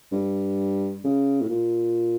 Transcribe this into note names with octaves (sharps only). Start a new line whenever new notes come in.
G2
C#3
A2
A#2